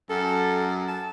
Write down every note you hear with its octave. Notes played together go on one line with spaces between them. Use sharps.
F#2 A4
A5